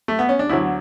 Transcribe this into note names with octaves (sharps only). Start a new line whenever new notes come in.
A3
B3
C#4
D4
D2 D3 F#3 E4